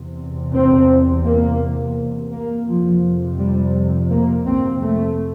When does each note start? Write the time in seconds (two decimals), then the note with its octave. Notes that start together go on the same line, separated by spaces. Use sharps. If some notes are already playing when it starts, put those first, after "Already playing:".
Already playing: E2 C3
0.52 C4
1.24 A#3
2.32 A#3
2.66 F2 C3 F3
3.38 G3
4.10 A#3
4.46 C4
4.82 A3